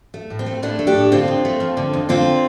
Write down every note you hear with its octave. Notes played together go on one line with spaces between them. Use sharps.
A3
A2
C4
A3
A2 A3 D4
A3
D4 G4
A2
D3 C4 F4
F2
A3
F3
D3
F2
D3 C4 F4